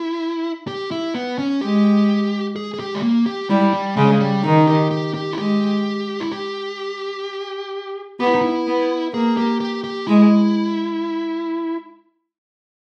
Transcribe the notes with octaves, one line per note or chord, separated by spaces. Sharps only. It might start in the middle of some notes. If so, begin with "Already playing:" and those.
Already playing: E4
G4
E4
B3
C#4
G#3 G4
G#4
G#4
G4
G#3
A#3
G4
G3 E4
G3
C#3 G#3
G3
D#3 D#4
G4
G4
G4
E4
G#3 G4
E4
G4
B3 G4
E4
D#4
E4
B3
A#3 G#4
G4
G4
G4
G#3 E4